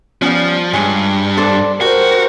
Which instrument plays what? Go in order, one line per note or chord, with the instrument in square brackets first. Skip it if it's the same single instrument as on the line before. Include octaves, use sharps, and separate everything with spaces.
[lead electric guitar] F3 [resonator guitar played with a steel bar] G3 B3 C#4
[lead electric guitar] G2 [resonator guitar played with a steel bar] G#3 C#5
[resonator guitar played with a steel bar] D4 A4 C5
[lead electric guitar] F#4 [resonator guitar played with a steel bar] G4 [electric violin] A#4 C5